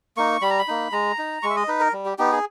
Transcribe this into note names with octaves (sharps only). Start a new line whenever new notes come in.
A#3 D#4 C#6
G3 B5
A#5
B5
A#3 D#4
G#3 A#5
D#4
G#3 C#6
E5
D#5
D#4 B4
A#4
G3
G4
B3 D#4 G4
G#4